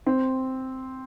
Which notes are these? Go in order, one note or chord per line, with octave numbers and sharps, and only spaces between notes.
C4